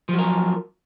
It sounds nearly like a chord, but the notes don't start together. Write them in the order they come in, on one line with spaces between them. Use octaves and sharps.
F3 F#3 A#4